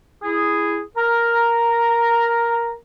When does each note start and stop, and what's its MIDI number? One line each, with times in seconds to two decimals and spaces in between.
0.22 0.79 64
0.22 0.79 68
0.96 2.74 70
0.96 2.74 82